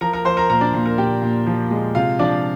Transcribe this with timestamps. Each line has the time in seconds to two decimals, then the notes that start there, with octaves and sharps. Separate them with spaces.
0.01 F3 A#4 A#5
0.13 A#4 A#5
0.25 F3 C5 C6
0.37 A#4 A#5
0.49 A#2 A#4 A#5
0.61 D4 D5
0.74 A#2
0.86 A#4
0.98 A#2 G4 G5
1.22 A#2
1.47 F3
1.71 G#3
1.95 C3 F4 F5
2.19 F3 D4 D5